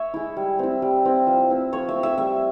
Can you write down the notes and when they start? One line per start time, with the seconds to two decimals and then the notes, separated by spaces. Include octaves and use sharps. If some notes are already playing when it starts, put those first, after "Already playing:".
Already playing: C#5 E5
0.14 G#3 E4
0.37 G3
0.59 C4 E4
0.82 G3
1.05 C4 E4
1.27 F3
1.50 C4 E4
1.73 F3 C#5
1.89 E5
1.95 C4 E4
2.03 E5
2.18 G3 E5